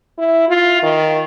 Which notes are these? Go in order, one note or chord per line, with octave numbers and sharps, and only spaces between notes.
E4
F4
D#3